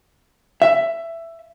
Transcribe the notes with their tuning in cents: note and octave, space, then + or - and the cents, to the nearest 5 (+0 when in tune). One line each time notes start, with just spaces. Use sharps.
E5 +15